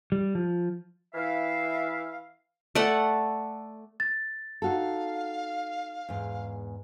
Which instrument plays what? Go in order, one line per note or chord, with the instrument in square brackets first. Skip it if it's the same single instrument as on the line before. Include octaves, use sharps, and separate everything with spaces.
[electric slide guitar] G3
F3
[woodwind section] E3 E5 F5
[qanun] A3 D5 F#5
[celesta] A6
[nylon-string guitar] D#4 F#4 A4 [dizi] F5
[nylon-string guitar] E2 G#2